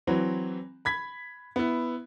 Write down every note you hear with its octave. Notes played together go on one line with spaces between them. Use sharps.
E3 F#3 C4 B4
B5 G#6 B6
B3 E4